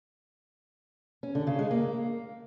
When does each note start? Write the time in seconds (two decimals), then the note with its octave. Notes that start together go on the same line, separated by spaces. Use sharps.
1.23 C#4
1.35 D3
1.47 C#3
1.59 G#3
1.71 A#3